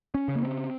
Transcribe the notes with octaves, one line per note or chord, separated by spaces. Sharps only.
C#4
C#3
A#3
C4